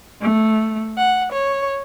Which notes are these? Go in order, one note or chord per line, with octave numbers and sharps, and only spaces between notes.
A3
F#5
C#5